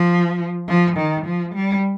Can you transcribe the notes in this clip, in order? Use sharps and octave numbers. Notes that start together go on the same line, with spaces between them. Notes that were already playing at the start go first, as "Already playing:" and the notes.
Already playing: F3
F3
D#3
F3
G3